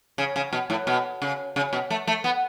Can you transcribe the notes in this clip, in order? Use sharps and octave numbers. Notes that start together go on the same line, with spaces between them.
C#3
C#3
B2
A2
B2
C#3
C#3
B2
A3
A3
B3